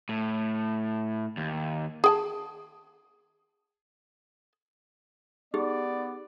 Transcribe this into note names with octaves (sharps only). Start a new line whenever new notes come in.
A2
D#2
G#4 G5 A5
B3 D#4 G4 G#4 D5